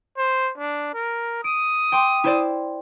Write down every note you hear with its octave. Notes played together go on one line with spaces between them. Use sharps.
C5
D4
A#4
D#6 D7
G5 C6 D6
E4 C5 D5